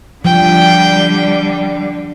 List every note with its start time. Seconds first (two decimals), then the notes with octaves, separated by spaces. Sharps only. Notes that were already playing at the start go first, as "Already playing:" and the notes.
0.25 D3 F3 G3 G5